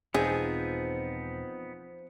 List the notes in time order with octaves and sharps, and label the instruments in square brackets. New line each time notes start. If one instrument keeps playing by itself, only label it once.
[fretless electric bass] E1 [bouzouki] F3 [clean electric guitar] B3 C4 D#4 [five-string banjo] G#4